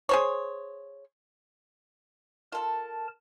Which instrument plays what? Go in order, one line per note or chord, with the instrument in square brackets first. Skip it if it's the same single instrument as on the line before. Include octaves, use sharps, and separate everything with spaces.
[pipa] G#4 C5 C#5
[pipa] F4 A4 [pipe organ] A#4 A5